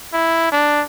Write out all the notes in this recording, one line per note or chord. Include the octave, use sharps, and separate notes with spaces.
E4
D4